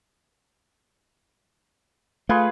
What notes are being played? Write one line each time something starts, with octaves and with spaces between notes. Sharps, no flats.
A3 F4 G#4 B4